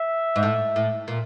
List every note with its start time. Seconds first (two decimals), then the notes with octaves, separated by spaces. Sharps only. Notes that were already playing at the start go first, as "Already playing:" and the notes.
Already playing: E5
0.36 G#2
0.43 A2
0.76 A2
1.08 A#2